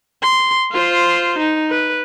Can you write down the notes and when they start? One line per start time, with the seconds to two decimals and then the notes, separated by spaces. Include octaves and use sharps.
0.22 C6
0.71 F4 C5
1.38 D#4
1.70 B4